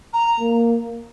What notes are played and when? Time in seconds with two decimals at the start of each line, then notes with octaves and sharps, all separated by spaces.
0.13 A#5
0.40 A#3